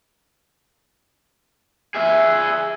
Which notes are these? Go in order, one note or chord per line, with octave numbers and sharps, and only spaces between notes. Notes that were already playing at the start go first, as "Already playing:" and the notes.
G#4 E5